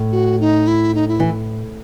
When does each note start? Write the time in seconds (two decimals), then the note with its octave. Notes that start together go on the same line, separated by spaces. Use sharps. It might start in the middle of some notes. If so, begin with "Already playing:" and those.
Already playing: A2
0.12 F#4
0.40 D#4
0.67 E4
0.95 D#4
1.08 E4
1.20 E3